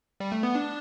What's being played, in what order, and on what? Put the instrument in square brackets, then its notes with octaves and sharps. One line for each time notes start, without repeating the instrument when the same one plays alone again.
[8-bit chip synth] G3
A3
B3
D4